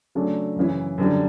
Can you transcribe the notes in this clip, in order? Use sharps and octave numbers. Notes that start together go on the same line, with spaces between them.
C#3 F#3 A3 D4
F#2 C#3 E3
F#2 D3 G3